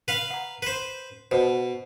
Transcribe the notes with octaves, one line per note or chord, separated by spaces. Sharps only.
B4 F5
F#5 A#5
B4 C5
B2 B4 C5 A5